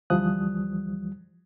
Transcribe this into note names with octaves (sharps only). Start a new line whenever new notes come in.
D2 E3 F3 G3 D#6 F#6